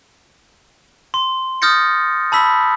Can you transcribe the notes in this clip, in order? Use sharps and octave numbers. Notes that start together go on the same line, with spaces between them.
C6
D#6 F6 G6 A6 A#6 C#7
A5 B5 E6 B6